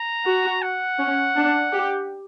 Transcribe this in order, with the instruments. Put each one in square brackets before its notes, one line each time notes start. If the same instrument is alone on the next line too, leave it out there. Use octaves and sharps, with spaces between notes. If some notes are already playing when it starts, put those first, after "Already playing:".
Already playing: [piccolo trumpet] A#5
[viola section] F#4
[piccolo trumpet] F#5
[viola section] C#4
D4
G4